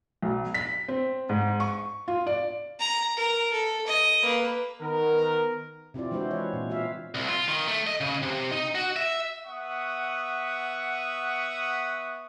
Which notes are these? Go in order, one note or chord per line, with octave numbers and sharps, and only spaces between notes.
B1
B6
C4
G#2
C#6
F4
D5
A#5
A#4
A4
D#5
A#3 B4
D#3 B3 A#4
C3 C4 E4 F4 D5
E3 G#3 D4 E4 F#4 C5
C#5
A#2 C4
C4 F4 F#4 E5 F5
C2
F4
D#3
A3
D#5
C#3
C3
D#4
F#4
E5
B3 E5 F#5 C#6 D#6